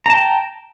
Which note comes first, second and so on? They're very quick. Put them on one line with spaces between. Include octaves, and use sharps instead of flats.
A#5 A5 G5